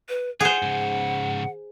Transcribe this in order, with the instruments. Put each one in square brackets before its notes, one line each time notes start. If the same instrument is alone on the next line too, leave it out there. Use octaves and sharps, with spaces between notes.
[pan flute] B4
[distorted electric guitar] F4 [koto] G#4 C5 [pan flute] F#5
[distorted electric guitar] G#2 C#3